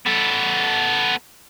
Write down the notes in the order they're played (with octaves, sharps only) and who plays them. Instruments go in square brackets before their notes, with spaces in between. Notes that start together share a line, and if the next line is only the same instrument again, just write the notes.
[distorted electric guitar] B3 A4